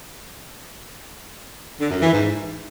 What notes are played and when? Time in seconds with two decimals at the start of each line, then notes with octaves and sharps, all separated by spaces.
1.80 D3
1.91 F#2
2.01 E3
2.12 G#2